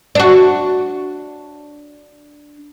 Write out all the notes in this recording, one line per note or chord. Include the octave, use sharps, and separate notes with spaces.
D4 F#4